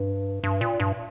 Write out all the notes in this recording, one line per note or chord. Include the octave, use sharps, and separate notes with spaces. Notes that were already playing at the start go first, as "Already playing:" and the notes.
Already playing: G2
G2
A#2
G2